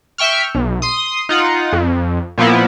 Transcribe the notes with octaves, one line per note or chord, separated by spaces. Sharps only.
E5 G5 C#6 F6
B1
C6 D#6
D#4 F4 F#5
F2
A#2 F3 A#3 B3 E4